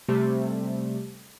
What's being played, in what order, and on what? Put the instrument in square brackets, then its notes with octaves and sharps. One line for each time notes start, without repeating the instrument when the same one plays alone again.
[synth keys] C3 G3 A3